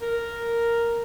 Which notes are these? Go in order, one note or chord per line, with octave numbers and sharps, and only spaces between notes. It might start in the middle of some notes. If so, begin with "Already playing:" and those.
A#4